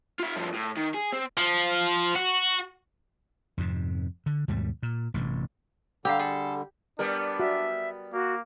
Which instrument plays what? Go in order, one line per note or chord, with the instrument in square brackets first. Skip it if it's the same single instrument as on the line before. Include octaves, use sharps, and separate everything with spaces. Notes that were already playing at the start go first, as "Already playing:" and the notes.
[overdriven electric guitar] F4 E5
G2 F3
A2
D#3
G#4
C4
[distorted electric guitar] F3
F#4
[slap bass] F2 G#2 C3
D3
D#2 G#2 B2 G3
A#2
A1 G2 C3
[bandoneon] D3 G3 [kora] G4 [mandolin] F5 A#5 E6
[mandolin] G#4 A4
[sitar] G3 B3 A#4 [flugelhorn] D4
[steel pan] F#4 [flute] E5
[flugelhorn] A#3 [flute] F#4